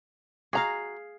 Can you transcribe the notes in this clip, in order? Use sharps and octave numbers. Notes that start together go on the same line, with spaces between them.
F#4 G#4 F5 A#5